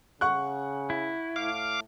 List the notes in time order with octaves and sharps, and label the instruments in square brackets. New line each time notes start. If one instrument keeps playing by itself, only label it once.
[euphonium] C#3 [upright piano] F#5 C#6 F#6
[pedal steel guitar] E4
[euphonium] A2 [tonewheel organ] F5 D6